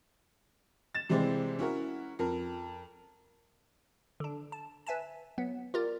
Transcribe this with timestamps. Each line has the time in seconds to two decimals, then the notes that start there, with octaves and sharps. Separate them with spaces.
0.95 A6 E7
1.09 C3 E3 G3 G#3 C4
1.59 C#4 E4 F#4 A#4
2.19 F2 A#4
4.20 D3 D4
4.52 A5
4.87 B4 E5 G#5 A5
5.38 F#3 B3
5.74 F4 G4 A#4 D5